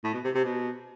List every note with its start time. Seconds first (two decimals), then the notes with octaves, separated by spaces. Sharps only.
0.04 A2
0.14 B2
0.24 C3
0.35 C3
0.45 B2